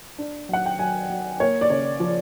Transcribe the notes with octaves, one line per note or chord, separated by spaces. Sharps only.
D4
F#3 F#5
G5
F#3 G#5
F#3
A#3 C#5
D5
C#3 C#5
F3